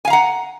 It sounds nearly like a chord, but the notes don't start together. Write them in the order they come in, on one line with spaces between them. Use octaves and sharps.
G#5 F5 A#5 F#5